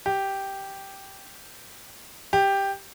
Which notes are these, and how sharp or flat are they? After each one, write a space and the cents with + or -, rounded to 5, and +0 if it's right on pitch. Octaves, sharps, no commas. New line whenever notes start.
G4 -5
G4 +5